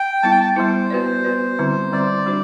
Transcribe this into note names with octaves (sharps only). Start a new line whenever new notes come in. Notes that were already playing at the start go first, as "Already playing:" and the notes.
Already playing: G5
G3 B3 E4 A5
G5
A5
G3 B3 E4 C5
B3 F#4 B4 D5
B3 F#4 B4 D5
D3 G3 C4 E4
D3 G3 C4 E4 D5
G3 D4 F#4 C5